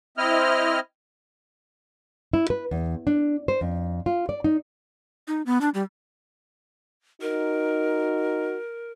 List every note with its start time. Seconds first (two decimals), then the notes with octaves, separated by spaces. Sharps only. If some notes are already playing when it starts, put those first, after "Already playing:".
0.18 C4 E4 D#5 F6
2.33 E4
2.50 B4
2.71 E2
3.07 D4
3.48 C5
3.61 F2
4.06 F4
4.29 D5
4.44 D#4
5.28 D#4
5.46 B3
5.61 D4
5.74 G3
7.21 D#4 F#4 A#4